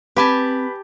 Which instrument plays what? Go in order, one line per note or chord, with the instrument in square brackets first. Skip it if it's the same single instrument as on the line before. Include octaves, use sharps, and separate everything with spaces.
[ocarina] C4 [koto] G4 G#5 A5 [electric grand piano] B4 B5